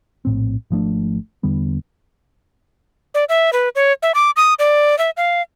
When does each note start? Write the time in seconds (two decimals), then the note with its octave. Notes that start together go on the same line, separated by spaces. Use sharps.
0.25 A#1 A2 C4
0.70 G#1 F3 A3 D4
1.43 E2 D3 G3 B3
3.14 D5
3.29 E5
3.53 B4
3.75 C#5
4.03 E5
4.15 D6
4.36 D#6
4.59 D5
4.99 E5
5.17 F5